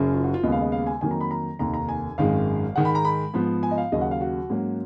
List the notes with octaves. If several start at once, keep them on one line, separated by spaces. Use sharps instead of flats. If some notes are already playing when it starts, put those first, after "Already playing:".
Already playing: F#1 F#2 C#3
F4
F#4
F4
D#2 C#3 G#3 B3 D#5
F5
D#5
F5
G#5
F2 D#3 F#3 A#3 G#5
A#5
B5
A#5
F1 D#2 D#3 A#5
A#5
G#5
G#1 F#2 D#3 G#3 F5
G#2 D#3 G#3 F#5
B5
A#5
B5
G#2 F3 B3
G#5
D#5
F5
D#2 C#3 F#3 D#5
F#5
F5
F#4
G#2 F#3 A#3 C#4